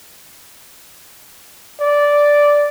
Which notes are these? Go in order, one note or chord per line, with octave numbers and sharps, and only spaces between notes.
D5